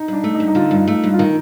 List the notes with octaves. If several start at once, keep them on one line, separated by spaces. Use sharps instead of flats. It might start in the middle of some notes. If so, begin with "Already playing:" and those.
Already playing: D#4
G2 D4
A3
D#4
G2
D#4
D3 F4
G2
A3
G2
F4
D#3 D#4